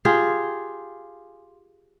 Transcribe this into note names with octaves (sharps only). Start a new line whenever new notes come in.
F4 G4 G#4